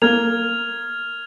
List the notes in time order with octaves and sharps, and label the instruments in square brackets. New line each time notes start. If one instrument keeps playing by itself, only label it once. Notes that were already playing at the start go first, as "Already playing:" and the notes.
[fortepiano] A#3 [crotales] F6 G#6 F7